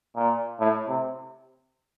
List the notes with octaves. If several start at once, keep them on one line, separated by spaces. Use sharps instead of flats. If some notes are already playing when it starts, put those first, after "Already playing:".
A#2
A2
C3